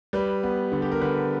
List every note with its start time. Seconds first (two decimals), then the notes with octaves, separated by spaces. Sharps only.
0.13 G3 B4
0.43 B3
0.72 D3
0.82 G4
0.92 A#4
1.01 D3 B4